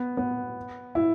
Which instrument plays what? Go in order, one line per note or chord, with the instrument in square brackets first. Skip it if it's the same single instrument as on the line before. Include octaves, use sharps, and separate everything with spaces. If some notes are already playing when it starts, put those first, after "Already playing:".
Already playing: [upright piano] B3
B3
E4